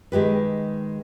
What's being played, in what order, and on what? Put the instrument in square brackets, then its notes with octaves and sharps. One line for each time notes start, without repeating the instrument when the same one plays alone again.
[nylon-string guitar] D#3 G#3 G4 B4